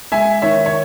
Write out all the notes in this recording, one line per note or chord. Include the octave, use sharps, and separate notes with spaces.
G#3 E5 G#5
D#3 C#5 E5
C#5